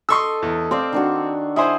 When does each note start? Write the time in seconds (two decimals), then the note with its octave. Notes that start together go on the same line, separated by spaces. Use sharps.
0.09 A4 D#5 C6 C#6 E6
0.42 E2
0.71 C4 D5 F5 C6
0.92 D#3 D4 F#4
1.56 E4 G#4 C5 D#5